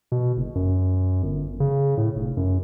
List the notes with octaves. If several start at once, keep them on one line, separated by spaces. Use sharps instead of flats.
B2
F#1
F#2
G1
C#3
A2
F1
F#2